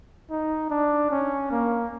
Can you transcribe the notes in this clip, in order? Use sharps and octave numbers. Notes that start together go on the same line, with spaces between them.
D#4
D4
C#4
A#3